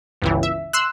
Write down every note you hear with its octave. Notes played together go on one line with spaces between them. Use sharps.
G1 C#2 E3
E5
C6 E6 F#6